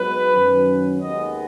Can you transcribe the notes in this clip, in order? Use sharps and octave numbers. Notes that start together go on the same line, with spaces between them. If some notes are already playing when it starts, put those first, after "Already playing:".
Already playing: G#2 F#3 B3 B4
F#2 D#3 F#3 C#4
D#2 D#3 G#3 B3 D#5